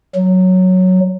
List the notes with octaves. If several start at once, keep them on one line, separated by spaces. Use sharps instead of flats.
F#3